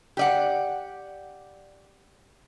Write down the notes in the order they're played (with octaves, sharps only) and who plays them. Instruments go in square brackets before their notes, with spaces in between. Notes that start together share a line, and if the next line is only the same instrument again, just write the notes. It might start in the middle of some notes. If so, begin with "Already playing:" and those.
[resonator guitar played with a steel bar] G4 D5 F#5